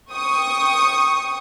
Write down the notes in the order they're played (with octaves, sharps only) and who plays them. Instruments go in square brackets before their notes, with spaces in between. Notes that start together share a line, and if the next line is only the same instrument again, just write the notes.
[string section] G5 C#6 D#6